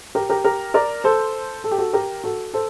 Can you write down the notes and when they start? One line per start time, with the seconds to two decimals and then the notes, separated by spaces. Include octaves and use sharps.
0.15 G4 A#4
0.30 G4 A#4
0.44 G4 A#4
0.74 A#4 D5
1.04 A4 C5
1.64 A4
1.71 G4
1.78 F#4 A4
1.93 G4 A#4
2.24 F#4 A4
2.54 A4 C5